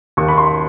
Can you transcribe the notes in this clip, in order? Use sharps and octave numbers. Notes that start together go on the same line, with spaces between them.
D#2 C#6
B5
C6